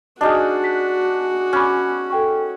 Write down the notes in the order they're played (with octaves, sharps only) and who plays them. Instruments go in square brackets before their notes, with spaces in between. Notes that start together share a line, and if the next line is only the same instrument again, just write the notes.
[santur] D4 D#4 G#4 [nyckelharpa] F#4 [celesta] D#5 D#6 F6
[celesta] B6
[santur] C#4 [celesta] B5 D6 F#6
[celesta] A4 G5 C#6